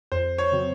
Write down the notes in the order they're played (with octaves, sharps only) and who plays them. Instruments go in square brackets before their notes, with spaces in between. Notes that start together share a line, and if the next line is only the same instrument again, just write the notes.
[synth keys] F2 [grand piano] C5
[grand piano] C#5
[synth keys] C#3 F#3 C4